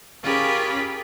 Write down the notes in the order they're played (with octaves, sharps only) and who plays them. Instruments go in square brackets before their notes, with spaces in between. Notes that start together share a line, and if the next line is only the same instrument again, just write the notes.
[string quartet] C#4 F4 G4 G#4 A#4 B5